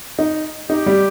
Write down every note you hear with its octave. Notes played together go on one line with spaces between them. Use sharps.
D#4
D#4 G4
G3